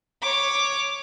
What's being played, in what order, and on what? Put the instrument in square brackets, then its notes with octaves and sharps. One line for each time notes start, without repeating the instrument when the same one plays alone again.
[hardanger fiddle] C#5 D6